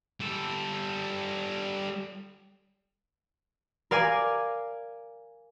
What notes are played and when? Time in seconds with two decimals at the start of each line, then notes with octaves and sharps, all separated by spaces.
0.20 G3 A4
3.91 A#4 D5 F5 G#5 D6